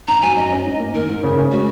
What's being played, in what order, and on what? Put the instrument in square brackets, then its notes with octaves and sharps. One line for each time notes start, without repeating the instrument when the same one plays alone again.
[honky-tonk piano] G#1 [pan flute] A#5
[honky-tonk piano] F#3 [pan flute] G#5
[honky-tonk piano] F#2 [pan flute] D#5
[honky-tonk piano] C#4
G#2
A#3
[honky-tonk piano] D#3 [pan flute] A#4
[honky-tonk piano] G#2
C#3
C#4
[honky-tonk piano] G#3 [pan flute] F#4